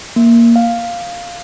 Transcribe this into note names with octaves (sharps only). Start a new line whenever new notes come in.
A#3
F5